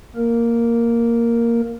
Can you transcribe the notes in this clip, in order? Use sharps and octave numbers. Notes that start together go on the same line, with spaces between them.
A#3 A#4